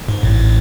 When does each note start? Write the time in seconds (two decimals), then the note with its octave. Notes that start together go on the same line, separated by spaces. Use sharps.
0.09 G#2
0.23 A1 A2